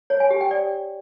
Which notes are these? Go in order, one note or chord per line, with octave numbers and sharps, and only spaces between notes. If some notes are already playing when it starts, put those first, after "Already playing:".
C#5
G#5
G4
G5
D5